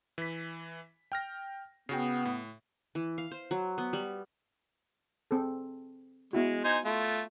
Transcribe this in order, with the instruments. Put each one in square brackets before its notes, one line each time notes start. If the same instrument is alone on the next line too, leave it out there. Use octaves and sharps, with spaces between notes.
[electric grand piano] E3 B6
G5 F6 A#6
[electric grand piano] C#3 F#4 G5 [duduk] B3
[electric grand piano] A2
[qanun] E3
F5
C5
F#3
B3
G3
[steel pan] C4 G#4 A4
[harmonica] G#3 [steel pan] B3 E4 F#4
[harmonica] D#4 C5 G#5
A3 F4